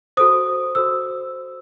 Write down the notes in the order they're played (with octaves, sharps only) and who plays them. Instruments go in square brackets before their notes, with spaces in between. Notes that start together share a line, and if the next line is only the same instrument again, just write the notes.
[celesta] F#4 A4 C5 D#6
F#4 A4 C5 E6